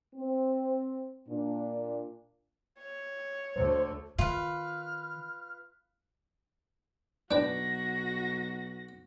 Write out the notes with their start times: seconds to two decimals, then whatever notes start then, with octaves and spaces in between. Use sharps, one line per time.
0.15 C4
1.29 A#2 D4
2.79 C#5
3.56 D2 A3 C5
4.18 D#3 F4 B4 F6
7.31 B1 D4 F#4 B4 G5 A#6